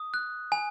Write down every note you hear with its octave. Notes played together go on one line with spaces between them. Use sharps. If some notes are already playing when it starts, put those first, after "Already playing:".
Already playing: D#6
F#6
G#5